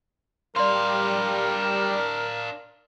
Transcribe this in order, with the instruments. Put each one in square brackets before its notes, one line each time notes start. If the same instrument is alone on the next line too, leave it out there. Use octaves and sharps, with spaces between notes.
[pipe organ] G3 [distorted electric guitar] D4 F5 [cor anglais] A#4 [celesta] D5 C6